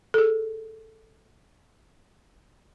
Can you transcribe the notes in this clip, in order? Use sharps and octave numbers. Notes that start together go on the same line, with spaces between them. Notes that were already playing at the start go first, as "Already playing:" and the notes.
G#4 A4